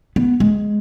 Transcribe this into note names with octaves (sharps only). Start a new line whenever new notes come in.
B3
G#3